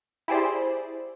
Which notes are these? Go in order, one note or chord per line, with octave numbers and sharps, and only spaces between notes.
E4 G4 G#4 C5 D5